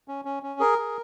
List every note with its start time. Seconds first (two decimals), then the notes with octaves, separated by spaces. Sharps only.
0.08 C#4
0.25 C#4
0.43 C#4
0.60 G#4 A#4
0.78 G#4